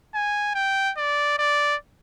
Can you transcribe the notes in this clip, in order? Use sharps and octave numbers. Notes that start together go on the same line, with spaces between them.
G#5
G5
D5
D5